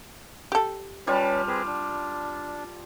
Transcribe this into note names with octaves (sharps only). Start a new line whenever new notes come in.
G4 A4
G3 C#4 F4 B4 A5
C4 G#4 B4
D4